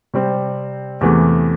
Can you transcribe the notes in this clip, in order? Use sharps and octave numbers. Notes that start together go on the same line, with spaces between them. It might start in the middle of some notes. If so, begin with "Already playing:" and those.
C3 G3 C4
E2 C3 E3 A3